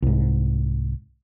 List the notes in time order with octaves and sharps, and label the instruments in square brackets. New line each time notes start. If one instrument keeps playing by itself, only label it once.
[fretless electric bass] C2 G#2